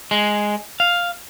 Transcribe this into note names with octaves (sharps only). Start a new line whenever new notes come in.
G#3
F5